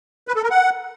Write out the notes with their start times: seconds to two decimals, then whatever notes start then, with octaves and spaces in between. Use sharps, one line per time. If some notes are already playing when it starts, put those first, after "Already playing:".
0.28 B4
0.36 A4
0.43 A#4
0.51 F#5